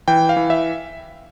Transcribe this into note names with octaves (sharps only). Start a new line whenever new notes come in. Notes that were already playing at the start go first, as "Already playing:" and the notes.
E3 G5
F5
E3
E5